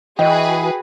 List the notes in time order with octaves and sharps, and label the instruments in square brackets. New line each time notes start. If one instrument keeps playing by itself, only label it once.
[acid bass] E3 [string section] F#4 G#4 B4 [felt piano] D#5 [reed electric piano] G5